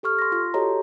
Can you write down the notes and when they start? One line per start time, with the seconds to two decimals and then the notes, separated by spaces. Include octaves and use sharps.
0.03 G4 A4 C#6 F6
0.19 C6 A#6
0.32 F4 C6
0.54 F#4 G4 A4 C#5 D#5 A#5